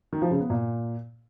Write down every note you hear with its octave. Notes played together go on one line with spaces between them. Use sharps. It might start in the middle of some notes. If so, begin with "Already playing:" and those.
D#3
F3
C#3
B3
A#2